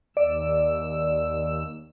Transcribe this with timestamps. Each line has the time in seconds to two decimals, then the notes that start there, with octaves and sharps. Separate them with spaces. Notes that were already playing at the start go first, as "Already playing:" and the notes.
0.17 D#2 D5 E6